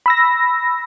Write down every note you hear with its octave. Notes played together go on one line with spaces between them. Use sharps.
B5 E6 A#6